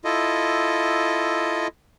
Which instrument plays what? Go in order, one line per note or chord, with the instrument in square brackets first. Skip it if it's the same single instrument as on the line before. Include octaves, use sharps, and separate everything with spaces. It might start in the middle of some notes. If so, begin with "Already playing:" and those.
[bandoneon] E4 F4 A4 D#5